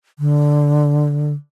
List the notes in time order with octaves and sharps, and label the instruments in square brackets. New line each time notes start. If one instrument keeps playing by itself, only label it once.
[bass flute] D3